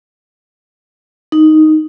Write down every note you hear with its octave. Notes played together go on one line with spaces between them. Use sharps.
D#4